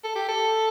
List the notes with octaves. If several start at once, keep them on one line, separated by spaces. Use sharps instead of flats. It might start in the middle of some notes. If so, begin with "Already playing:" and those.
A4
G4
A4